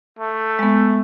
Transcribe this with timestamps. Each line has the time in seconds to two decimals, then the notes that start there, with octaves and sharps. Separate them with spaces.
0.19 A3
0.59 G#3 B3